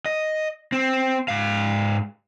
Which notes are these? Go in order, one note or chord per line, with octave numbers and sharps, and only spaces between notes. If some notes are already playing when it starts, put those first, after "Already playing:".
D#5
C4
G#2 F5